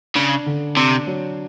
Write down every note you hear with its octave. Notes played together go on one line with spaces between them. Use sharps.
C#3 D4
D3
C3 D4
F#3